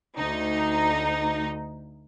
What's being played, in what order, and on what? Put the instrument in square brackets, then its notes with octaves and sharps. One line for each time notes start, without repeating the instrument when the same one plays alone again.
[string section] D2 D#4